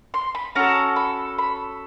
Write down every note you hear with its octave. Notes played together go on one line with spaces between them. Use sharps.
C6
B5
C#4 F#4 A4 A#5
B5
B5